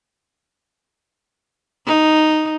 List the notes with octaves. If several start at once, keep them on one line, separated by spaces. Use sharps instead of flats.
D#4